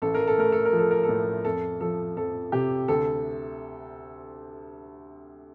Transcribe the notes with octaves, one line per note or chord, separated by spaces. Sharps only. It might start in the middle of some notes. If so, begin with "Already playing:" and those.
A1 A4
A#4
A4
A3 A#4
A4
A#4
F3
A4
A#4
A4
A2
F2 A4
F3 A4
F2 A4
C3 G4
D2 A4